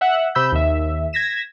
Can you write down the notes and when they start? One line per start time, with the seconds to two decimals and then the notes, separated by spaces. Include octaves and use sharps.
0.01 E5 F#5
0.35 C3 B5 E6 G6
0.52 D#2 E5
1.13 G#6 A#6 B6 E7